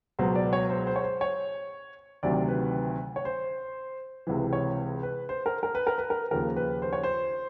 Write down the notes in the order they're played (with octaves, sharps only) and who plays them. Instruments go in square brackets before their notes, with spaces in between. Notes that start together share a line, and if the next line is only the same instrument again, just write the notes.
[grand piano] C#2 B2 F#3 C5
D5
C#5
C5
C5
C#5
C5
C#5
D2 C3 D#3 F#3 D5
B4
C#5
C5
C#2 C3 E3
C#5
B4
C5
A#4
A#4
B4
A#4
B4
A#4
D#2 C#3 F3 A#4
B4
C5
C#5
C5